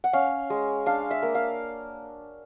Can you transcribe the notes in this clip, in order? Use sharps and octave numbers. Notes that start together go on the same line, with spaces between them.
F#5
C#4 F5
G#3
D4 F5
E5
A#3
F5